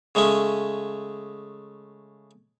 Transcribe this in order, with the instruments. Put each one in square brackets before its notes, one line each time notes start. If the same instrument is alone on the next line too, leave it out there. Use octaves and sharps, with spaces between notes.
[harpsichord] C#3 G#3 A3 C#4